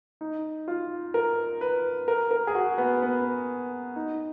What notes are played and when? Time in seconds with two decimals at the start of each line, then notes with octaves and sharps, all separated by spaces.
0.21 D#4
0.68 F4
1.14 A#4
1.61 B4
2.08 A#4
2.31 A#4
2.47 G#4
2.55 F#4
2.78 B3
3.02 B3
3.96 D#4